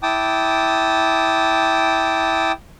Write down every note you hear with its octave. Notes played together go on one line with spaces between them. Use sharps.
E4 G5 A5 D6 D#6